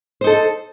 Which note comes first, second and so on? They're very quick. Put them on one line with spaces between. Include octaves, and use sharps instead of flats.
C5 D#4 A4